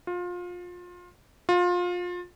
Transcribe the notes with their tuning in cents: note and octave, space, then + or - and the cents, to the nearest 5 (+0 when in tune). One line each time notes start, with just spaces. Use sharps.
F4 +25
F4 +25